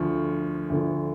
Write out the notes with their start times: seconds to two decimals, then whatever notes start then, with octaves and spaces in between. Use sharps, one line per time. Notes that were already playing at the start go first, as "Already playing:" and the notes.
Already playing: D2 D3 F3 C#6
0.70 D2 D3 F3